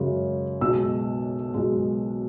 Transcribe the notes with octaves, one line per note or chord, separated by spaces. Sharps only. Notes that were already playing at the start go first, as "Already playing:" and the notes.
Already playing: F#2 C#3 G#3
B1 B2 G#3 E6
B1 B2 G#3